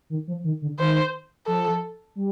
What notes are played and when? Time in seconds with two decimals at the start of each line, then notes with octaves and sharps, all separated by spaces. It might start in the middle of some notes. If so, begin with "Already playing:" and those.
0.10 D#3
0.28 F3
0.44 D#3
0.62 D3
0.79 D#3 C5
1.47 F3 A4
2.16 G3